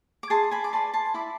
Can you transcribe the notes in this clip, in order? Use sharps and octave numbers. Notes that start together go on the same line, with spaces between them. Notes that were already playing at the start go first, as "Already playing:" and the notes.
D6
G#4 A5 C6
G#5 B5
D6
B4 D5 A5 C6
A5 C6
E4 B5 D6